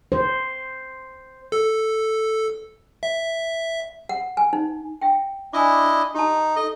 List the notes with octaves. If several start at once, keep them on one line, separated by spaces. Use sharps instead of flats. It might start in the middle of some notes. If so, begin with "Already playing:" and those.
C5
A4
E5
F#5
G#5
D#4
E5 G5
D4 E4 D#5 G#5 D6
D5
D#4 G4 A5
A4 D#5